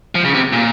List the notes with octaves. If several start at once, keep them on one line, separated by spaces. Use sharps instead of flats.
F3
C#3
C3
A#2